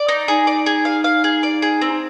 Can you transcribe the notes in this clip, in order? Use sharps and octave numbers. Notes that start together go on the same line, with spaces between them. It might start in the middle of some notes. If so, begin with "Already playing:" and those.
Already playing: D5
D#4
D#4 G#4
D5
G#4
F5
F5
G#4
D5
G#4
C4